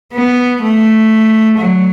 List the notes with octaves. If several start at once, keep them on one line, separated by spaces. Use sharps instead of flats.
B3
A3
F#3